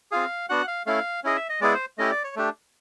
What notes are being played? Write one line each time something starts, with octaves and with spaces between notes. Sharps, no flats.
C4 F4 G#4 F5
B3 D4 F#4 F#5
F5
A3 C#4 E4 F5
C#4 E4 G#4 D#5
E5
D#5
G#3 B3 E4 G#4 D5
C5
A3 C#4 E4 G4 D#5
D5
C#5
A3 D4 G4